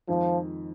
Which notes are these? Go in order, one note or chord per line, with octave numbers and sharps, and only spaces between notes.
F2 D#3 F3 G#3